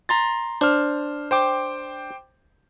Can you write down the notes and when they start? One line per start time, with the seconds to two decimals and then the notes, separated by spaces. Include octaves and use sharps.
0.09 A#5 C6 A6
0.61 D4 C5 F6
1.31 C5 G5 D6